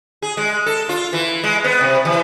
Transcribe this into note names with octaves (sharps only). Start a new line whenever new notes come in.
G#4
G#3
A4
F4
E3
G#3
B3
C3
E3